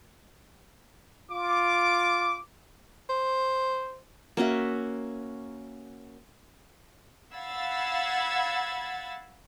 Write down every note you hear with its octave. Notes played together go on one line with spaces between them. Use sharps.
F4 D6
C5
A#3 C#4 F#4 E5
F5 F#5 B5 E6 G#6 A6